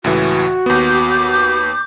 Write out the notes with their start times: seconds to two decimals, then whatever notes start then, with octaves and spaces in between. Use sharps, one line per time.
0.04 C#2 A2 E3 F#4
0.66 D#2 B3 D6 G6